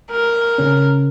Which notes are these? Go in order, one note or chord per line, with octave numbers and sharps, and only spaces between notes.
A#4
C#3 C#4